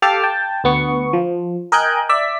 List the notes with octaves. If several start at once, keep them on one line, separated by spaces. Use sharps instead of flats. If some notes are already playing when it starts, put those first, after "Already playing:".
G4 A4 F5 A5 D6 F6
G5 A5
D2 B3 C#6
F3
A#4 D#5 G5 G#5 F#6 G6
D5 E5 B6